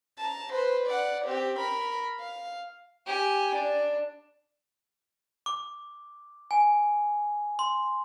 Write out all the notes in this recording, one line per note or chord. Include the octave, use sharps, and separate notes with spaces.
A5 A#5
B4 C5
D5 F#5
C4 G4
A#4 B5
F5
G4 G#5
D4
D6
G#5
C6